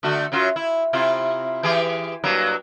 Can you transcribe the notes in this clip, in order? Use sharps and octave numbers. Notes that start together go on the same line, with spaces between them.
D3 A3 F#4
F#2 F#3 F4
E4
C3 E4 F4
E3 G4 G#4
G2 F#3 A#3